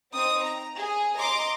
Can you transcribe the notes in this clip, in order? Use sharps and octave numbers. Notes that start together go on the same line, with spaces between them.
C4 D#4 D#6
A#5
G#4
D#5 A#5 C6 D6